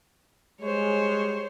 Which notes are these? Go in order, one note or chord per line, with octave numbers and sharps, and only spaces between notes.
G3 G#3 C5 C#5